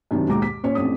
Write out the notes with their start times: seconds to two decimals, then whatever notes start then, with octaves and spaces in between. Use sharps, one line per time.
0.11 F#2 C3 D#3 B3 D4
0.28 D#2 G#2 B2 G#3 A#5 D6
0.42 B6
0.63 A#2 C#4 C#5
0.75 A1 F2 C4 D4 D#6